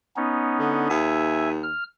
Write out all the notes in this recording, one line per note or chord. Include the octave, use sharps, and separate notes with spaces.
B3 C#4 D#4
D3
D#2 E5 G#5
F6